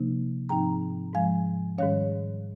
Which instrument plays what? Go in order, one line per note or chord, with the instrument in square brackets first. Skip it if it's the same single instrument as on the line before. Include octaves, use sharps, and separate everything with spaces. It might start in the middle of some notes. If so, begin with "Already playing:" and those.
Already playing: [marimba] C3 F3 A#3 D#4
G#2 F3 C4 D#4 G5 A#5
G#2 F3 G#3 F5 G#5
G#2 D#3 G3 C#4 C#5 F5